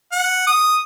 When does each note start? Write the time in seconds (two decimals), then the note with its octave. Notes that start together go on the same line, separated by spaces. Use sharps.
0.12 F#5
0.47 D#6